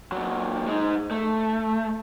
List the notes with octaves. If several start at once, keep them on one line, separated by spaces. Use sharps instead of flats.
A#2 F#3
G#3 D#4
A3